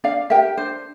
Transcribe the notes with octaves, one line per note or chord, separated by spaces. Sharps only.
D4 D5 F5
G4 A#4 E5 G5
D4 C5